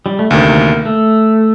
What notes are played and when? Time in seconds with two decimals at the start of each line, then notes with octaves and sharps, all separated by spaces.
0.06 G3
0.19 A3
0.31 D2 C3 D#3 A#3
0.86 A3